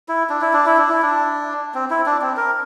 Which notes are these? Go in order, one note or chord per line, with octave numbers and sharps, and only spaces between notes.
E4
D4
E4
D4
E4
D4
E4
D4
C4
E4
D4
C4
A#4